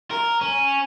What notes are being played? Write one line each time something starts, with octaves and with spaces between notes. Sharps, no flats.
A#4
C#4